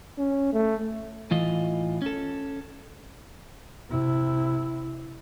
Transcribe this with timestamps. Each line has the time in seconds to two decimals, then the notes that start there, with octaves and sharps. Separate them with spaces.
0.18 C#4
0.53 A3
1.31 A2 E3 F4 D#5
2.02 C#4 A4
3.89 C3 E4